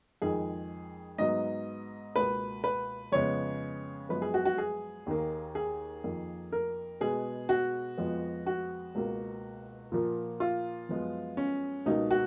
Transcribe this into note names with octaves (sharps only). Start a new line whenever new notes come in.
F2 D#3 G#3 G#4
G#2 F#3 B3 D#5
C#2 B2 A#3 B4
B4
F2 C#3 G#3 B3 C#5
F#2 F3 G#3 B3 B4
G#4
F#4
F#4
G#4
D#2 D#3 A#3
G#4
F2 D#3 A#3
A#4
B2 G#3 B3 G#4
F#4
F2 F3 G#3 B3
F#4
C#2 B2 A#3
A#2 F3 A#3
F4
F#2 F3 G#3 B3
C#4
C#2 B2 A#3 D#4
F#4